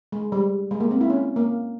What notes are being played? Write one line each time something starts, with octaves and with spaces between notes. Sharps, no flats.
G#3
G3
G#3
A#3
C4
E4
C#4
A#3